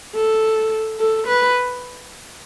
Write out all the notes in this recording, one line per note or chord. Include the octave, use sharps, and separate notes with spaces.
A4
A4
B4